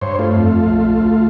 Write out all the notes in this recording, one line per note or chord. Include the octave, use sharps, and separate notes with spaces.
G2 C5 C#5
A3 F4
F2
A#1
D2